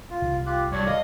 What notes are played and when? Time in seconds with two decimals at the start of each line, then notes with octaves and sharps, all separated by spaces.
0.10 F4
0.22 C2
0.46 F4 G4 F#6
0.72 G2 C#5 D5
0.88 D#5 F5